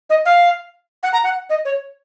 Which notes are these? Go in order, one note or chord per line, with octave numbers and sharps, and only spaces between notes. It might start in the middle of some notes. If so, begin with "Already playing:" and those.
D#5
F5
F#5
A#5
F#5
D#5
C#5